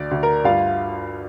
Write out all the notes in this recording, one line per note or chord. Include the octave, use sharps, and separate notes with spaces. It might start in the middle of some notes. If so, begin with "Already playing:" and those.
Already playing: D2 D5
D2
A#4 A#5
G2 F4 F5